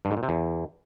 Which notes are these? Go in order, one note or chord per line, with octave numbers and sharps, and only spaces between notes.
G2
G#2
A#2
C3
E2